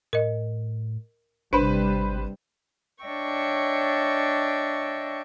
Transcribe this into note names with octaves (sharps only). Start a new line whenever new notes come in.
A2 A#4 D#5
G#1 C3 G3 D4 B4 C5 B5
D4 C#5 D#5 E5 G5 C#6